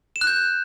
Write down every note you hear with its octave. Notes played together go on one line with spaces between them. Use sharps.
E7
F#6
G6